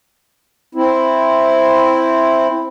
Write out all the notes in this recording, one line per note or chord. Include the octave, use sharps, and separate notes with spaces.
C4 E4